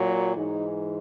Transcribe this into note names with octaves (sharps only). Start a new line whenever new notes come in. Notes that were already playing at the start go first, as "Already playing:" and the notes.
Already playing: A#2 F#3
G#2 E3 G#3 D#4